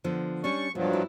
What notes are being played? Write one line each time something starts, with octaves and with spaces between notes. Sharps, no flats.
D3 F3 B3
G3 C#4 D4 C#6
G2 B2 F3 F#3
E4